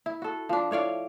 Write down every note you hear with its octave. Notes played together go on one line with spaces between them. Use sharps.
E4
F#4 A4
F3 D4
A2 C#5 D5 F5